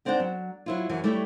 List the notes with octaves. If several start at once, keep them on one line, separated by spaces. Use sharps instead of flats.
G#2 C4 D4 D5 F#5 G5
F#3
F#3 E4 F4
F#2 E3 F#3
G3 A3 E4 G4 C#5